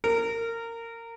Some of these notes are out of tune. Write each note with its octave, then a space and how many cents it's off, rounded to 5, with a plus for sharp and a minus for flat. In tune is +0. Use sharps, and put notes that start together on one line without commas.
A#4 -20